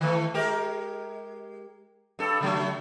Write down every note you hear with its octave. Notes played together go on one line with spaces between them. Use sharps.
D#3 E3 A3
G#3 G4 A#4
G2 A4
C#3 F#3 A3